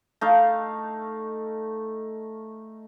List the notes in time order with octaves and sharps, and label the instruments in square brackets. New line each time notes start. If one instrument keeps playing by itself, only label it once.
[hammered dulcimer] A3 D#4 F5